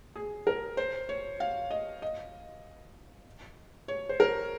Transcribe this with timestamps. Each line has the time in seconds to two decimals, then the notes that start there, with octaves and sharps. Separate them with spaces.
0.16 G#4
0.47 A#4
0.77 C5
1.09 C#5
1.40 F5
1.71 D#5
2.02 D#5
3.88 C#5
4.09 C5
4.20 A#4